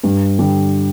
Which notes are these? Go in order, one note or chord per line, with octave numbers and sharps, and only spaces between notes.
G2
D3 G3